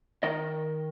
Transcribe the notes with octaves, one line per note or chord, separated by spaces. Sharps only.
D#3 D#5